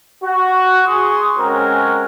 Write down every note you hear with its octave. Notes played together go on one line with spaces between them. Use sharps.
F#4
G#4 C6 C#6 D#6
G#3 C4 C#4 F#4 A#4